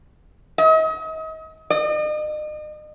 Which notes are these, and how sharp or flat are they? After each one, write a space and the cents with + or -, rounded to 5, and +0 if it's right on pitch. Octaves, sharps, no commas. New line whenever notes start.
D#5 +35
D#5 -40